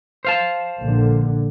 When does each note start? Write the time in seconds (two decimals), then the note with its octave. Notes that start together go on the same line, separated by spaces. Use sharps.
0.25 C5 F5 A5
0.82 A#1 D3